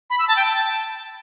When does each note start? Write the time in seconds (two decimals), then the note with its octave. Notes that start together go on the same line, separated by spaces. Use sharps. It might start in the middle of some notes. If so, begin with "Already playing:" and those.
0.10 B5
0.19 E6
0.28 A5
0.37 G5
0.46 A5